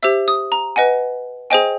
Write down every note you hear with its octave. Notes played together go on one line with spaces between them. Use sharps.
G4 C5 E5 E6
D#6
A#5
B4 D#5 F#5 G#5
G#4 C5 D#5 G5 G#5